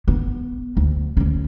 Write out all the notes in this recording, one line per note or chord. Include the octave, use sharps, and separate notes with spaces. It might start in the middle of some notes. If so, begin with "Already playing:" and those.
B3
D2
D2 C#4